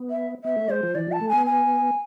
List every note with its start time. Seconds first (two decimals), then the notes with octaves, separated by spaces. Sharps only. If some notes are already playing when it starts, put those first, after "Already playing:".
Already playing: B3
0.10 E5
0.44 B3 E5
0.56 A3
0.69 G#3 C5
0.83 F3
0.95 E3 D5
1.08 F3 A5
1.21 A3
1.29 B3 G#5
1.46 G#5